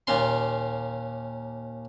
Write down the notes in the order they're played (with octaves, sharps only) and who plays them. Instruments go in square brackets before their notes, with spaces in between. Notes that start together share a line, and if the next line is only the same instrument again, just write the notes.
[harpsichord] D#2 A#2 C#4 C6